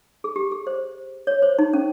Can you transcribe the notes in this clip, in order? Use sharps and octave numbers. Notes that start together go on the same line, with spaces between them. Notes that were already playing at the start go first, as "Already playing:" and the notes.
G#4
G4
G#4
C5
C#5
C5
D#4
C#4